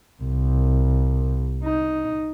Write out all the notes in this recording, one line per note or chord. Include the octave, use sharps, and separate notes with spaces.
C2
D#4